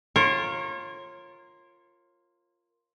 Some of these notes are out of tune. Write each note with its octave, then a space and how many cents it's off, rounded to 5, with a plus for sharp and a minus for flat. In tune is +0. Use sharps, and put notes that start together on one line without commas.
F4 +0 A#4 +0 C#5 -30